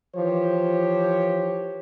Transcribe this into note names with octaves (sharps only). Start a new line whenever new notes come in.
E3 F3 F4 G4 C5 C#5